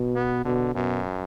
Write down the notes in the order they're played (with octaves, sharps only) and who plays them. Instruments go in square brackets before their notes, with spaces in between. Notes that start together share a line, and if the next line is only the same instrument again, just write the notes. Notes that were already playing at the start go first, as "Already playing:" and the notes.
Already playing: [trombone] B2
[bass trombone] B3
[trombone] B2 [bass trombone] D3
[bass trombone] F#2 [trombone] B2